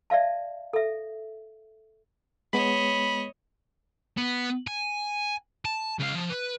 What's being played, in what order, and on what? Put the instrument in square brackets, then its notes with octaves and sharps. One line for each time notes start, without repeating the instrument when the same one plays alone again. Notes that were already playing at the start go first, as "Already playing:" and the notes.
[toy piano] D5 E5 F5 A5
A4 E5
[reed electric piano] G#3 B3 [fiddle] C#5 D#5 [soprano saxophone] B5
[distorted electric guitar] B3
G#5
A5
C#2 F5
F3
B4